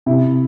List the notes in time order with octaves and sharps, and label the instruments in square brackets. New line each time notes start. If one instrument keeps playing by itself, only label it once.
[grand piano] C3 E4